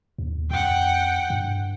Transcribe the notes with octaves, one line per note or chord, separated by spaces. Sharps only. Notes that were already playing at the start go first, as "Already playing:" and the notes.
D#2
F2 F#5 G5
G2